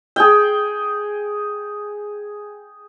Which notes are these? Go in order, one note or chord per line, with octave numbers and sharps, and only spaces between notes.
G#4 G5